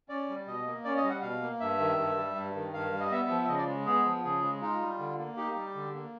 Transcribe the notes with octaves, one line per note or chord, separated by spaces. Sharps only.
C#4 D5
G3
B2 D#5
A#3
C#4 D5
D#5
G3
F#5
B2 F5
A#3
G2 E5
D#3
G2
G3
G2
D#3
G2 F5
G3
D#5
B3 E5
F3
E5
C#3 D#5
D5
G#3
B3 G#4
F3
C#3 G#4
G#3
D#4 F4
G3
D3
A#3
D#4 G4
G3
D3
A#3